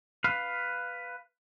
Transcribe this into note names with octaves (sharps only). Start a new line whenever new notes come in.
B4 F5